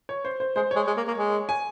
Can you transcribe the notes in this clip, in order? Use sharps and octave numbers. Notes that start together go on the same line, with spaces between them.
C#5
C5
C5
G#3 C5
G#3 C#5
G#3
A#3
A#3
G#3
G#5